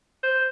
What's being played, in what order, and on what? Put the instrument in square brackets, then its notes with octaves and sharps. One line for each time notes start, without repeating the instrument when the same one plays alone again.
[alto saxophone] C5